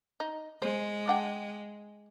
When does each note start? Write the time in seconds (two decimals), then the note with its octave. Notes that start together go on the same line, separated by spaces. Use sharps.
0.20 D#4
0.62 G#3 C5
1.08 D4 F#5 G5